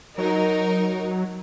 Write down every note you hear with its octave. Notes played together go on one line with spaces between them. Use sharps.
F#3 D#4 A#4